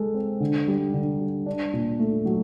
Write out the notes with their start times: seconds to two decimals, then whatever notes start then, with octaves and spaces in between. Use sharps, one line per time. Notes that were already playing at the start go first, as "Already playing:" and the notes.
Already playing: G#3 A4
0.14 C4
0.40 D3
0.68 G3
0.94 D3
1.20 G3
1.46 D4
1.73 A#2
1.99 A3
2.25 F#3